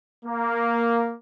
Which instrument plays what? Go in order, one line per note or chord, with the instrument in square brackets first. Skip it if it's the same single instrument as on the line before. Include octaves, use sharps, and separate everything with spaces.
[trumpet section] A#3